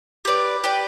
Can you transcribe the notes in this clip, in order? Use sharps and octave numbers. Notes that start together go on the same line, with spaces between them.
G4 B4 D5
G4 B4 D5